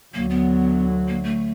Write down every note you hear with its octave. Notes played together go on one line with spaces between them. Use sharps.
D2 D3 F#3 A#3
B3
A#3
A3